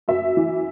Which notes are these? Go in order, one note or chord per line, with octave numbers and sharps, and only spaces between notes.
F#2 E5
E3